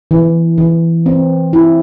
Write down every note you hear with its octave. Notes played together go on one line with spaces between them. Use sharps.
E3
E3
C4
E4